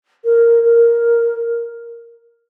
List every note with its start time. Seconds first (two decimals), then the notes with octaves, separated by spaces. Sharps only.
0.24 A#4
0.63 A#4